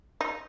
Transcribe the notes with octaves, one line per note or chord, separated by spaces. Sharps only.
D#4